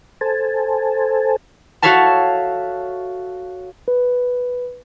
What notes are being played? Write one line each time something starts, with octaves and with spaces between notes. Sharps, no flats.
A4 C5 G#5 A5
F#4 A4 C#5 E5 F5 A5
B4